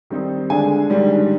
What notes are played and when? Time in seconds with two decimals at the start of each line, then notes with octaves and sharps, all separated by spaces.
0.10 D#3 G3 C4 D#4
0.50 D3 G#3 D4 G#5
0.90 G#2 D#3 G3 D4